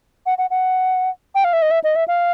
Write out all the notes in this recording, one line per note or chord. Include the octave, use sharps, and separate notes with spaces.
F#5
F#5
F#5
G5
F5
E5
D#5
E5
D#5
E5
F5